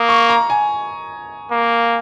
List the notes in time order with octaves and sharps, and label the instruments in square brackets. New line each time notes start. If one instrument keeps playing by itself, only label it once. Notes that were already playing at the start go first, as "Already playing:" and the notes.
Already playing: [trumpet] A#3 [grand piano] D#6
[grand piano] C#6
A#5
G#5
[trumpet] A#3